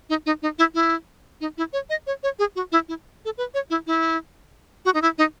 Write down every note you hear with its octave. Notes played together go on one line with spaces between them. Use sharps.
D#4
D#4
D#4
E4
E4
D#4
E4
C#5
D#5
C#5
C#5
G#4
F#4
E4
E4
A4
B4
C#5
E4
E4
F#4
D#4
E4
D#4